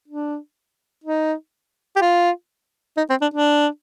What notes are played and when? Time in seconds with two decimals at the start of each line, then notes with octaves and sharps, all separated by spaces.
0.08 D4
1.04 D#4
1.96 G4
2.01 F4
2.97 D#4
3.10 C4
3.21 D4
3.34 D4